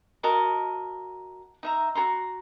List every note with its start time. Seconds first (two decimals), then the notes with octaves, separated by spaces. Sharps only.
0.23 F#4 A#4 D#5 A5
1.63 D#4 E5 A#5
1.95 F#4 A4 A#5 C6